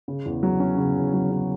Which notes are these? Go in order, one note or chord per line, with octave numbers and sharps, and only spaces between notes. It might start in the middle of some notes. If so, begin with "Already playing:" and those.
C#3
E2
F#3
C#4
C#3
E2
F#3
C#4